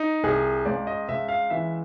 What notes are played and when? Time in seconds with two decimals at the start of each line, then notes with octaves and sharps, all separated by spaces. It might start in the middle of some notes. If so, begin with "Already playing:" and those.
Already playing: D#4
0.23 C2 G#4
0.65 C#2 D5
0.87 D#5
1.09 C#2 E5
1.29 F5
1.50 E3 E5